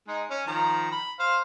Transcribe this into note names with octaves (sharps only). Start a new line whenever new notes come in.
G#3 D#4
C#4
D#3 F3 A#5
B5
C5 F5